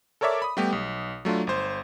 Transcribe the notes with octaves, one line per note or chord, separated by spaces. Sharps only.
A4 A#4 C#5 D5 E5 D6
B5 D#6
G3 A3 B3 G4
B1
F#3 A3 D4 F4
G1 C5